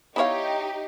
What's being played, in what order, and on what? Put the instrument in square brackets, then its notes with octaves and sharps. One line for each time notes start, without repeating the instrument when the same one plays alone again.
[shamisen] B3 D5 F5 [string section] D#4 G4 [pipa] E4 C#5